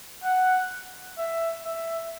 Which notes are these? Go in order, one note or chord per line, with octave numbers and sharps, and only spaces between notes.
F#5
E5
E5